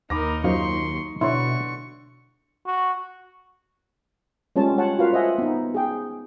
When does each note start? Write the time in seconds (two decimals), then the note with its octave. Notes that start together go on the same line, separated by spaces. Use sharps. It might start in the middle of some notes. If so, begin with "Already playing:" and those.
0.10 D#2 D#4 A#4 B5 D6 A#6
0.44 F#2 D#4 F4 C5 C6 C#6
1.21 B2 D3 E4 B4 C#5 C6 C#6
2.66 F#4
4.56 G3 G#3 C#4 F4 C#5 A5
4.78 C#5 F#5 A5
4.99 F4 F#4 A#4 B4 F5
5.13 C5 D#5 E5 F#5 G#5
5.38 B3 D#4
5.74 G#4 G5